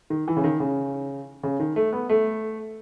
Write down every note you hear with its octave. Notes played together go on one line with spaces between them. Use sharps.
D#3
E3
C#3
D#3
C#3
C#3
D#3
A3
B3
A3